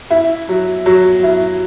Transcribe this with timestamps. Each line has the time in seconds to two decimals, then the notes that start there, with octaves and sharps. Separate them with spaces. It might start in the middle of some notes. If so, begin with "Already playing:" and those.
0.10 E4
0.49 F#3
0.86 F#3
1.23 E4